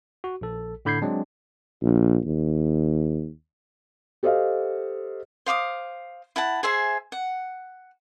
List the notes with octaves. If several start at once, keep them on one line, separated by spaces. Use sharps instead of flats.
F#4
A#1 A4
A2 D3 B5 G6 G#6 C7
F#3 G#3 C4 D4
A#1
D#2
G4 A4 C5 D#5 F5
C5 F5 D6 D#6
E4 F#5 A5
G#4 C5 E5 G#5
F#5